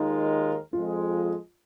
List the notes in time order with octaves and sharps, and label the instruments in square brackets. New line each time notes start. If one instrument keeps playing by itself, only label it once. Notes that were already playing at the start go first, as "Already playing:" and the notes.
Already playing: [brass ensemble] D#2 D#3 G#3 F4 A#4 [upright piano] D#4
[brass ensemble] F2 F3 G#3 [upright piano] F4